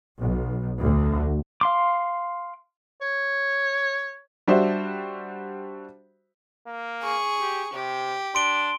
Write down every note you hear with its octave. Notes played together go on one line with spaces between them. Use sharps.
B1
D2
F5 C6 D6
C#5
G3 D4 F#4 C5 E5
A#3
G#4 C#6
G4
C3 G4
D4 C6 D7 G7